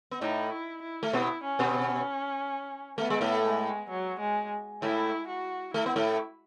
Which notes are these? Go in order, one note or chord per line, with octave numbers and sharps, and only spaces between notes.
B3
A2 A3 D#4
E4
E4
A3
B2 B3 E4
C#4
B2 B3
C#4
A3 B3
G#3
A2 A3
G#3
F#3
G#3
A2 A3 E4
F#4
A3 E4
B3
A2 A3